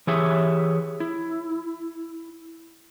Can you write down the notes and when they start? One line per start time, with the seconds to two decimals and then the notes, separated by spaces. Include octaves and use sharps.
0.07 E3 G4 G#4 C#5 E5
1.00 E4